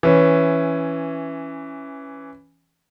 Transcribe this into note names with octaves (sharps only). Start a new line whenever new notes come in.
E3 C#4